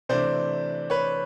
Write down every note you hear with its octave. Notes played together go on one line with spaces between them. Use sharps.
C3 E3 A3 D4 C5 D5
B4 C#5